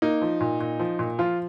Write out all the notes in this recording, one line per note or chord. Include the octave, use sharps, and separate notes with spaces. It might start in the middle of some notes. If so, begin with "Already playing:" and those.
A#3 D#4
F3
A#2
A#2
F3
A#2
F3 F4